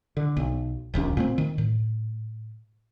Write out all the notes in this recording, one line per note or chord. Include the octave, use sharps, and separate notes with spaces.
D3
B1
D1 A#1 D#2 C#4
A#2 A3 C4
D#3
A2